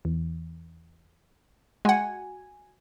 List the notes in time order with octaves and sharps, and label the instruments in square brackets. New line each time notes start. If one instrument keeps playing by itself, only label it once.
[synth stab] E2
[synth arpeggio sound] G#3 F#5 [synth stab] F#4 G#5